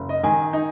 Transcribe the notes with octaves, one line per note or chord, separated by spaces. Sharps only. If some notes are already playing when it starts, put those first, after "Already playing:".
Already playing: F#1
D#5
D#3 G#5
D#4